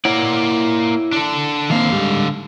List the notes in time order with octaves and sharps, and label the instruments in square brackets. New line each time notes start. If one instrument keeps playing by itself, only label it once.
[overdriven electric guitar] A#3 D5 [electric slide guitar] E4 C#5 F#5
[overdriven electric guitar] D4 A4
[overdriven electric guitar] D3 F5 [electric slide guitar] D#3 A#3 C4
[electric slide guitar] G#2 G3